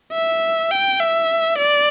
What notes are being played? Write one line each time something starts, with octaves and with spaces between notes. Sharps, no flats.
E5
G5
E5
D5